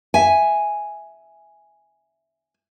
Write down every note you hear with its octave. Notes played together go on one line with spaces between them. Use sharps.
E5 G#5